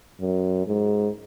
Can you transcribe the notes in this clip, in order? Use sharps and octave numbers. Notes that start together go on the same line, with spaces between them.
F#2
G#2